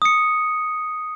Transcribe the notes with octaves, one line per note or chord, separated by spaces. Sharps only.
D#6 C#7